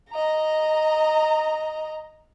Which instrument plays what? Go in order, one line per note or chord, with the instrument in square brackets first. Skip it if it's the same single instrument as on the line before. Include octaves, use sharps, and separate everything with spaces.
[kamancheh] D#5 A#5